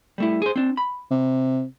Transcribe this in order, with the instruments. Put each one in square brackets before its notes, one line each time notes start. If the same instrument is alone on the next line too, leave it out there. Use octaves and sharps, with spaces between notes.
[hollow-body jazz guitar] G3 A3 E4
G#4 C5
C4 D4
B5
[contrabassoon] C3